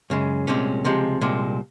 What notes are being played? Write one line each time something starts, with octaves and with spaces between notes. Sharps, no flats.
F#2 C#3 G#3
C2 A#2 G#3 C4 C#4
C#2 C3 F3 G#3
C2 A#2 G#3 C4